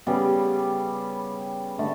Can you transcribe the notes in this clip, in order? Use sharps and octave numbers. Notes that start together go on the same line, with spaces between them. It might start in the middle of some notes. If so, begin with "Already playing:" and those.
C#3 G3 B3
D3 A3